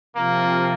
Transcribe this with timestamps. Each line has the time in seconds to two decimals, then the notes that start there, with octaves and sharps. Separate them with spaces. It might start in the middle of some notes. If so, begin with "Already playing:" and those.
0.16 C3 F3 A#3 C4 F4